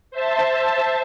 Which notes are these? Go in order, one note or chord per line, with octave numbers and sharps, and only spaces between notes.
C5 E5 A5